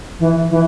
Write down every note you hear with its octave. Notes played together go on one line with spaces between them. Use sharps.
E3
E3